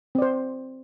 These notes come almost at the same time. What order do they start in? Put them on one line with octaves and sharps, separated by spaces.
C4 D5 C5